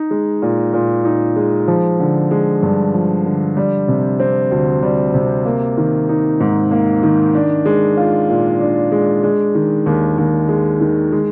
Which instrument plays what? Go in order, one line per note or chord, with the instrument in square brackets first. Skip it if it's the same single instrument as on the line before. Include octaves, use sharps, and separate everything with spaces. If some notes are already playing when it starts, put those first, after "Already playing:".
Already playing: [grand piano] D#4
G#3
A#2
A#2
D#4
G#3
F3
D3
G#3
G2
F3
D3
G3
C3
C4
D2
G3
C3
A#3
D#3
D#4
G#2
A#3
D#3
D4
G#3
F4
A#2
D4
G#3
G#3
D#3
D#2
D#2
G#3
D#3
G#3